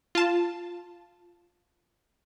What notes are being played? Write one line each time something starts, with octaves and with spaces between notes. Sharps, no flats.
F4 A5